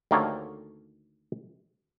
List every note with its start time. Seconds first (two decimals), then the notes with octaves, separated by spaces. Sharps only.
0.11 D2 D#3 A#3 G4 A4 C#5